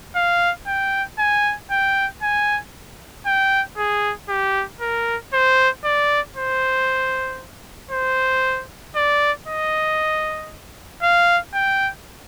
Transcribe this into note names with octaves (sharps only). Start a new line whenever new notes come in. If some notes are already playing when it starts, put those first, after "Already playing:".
F5
G5
G#5
G5
G#5
G5
G#4
G4
A#4
C5
D5
C5
C5
D5
D#5
F5
G5